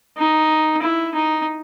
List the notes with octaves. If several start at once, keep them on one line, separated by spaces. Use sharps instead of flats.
D#4
E4
D#4